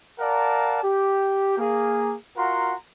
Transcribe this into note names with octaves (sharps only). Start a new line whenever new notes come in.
A#4 D5 F5 F#5 A5 A#5
G4
A#3 G#4
F4 F#4 A#4 F#5 A#5 C6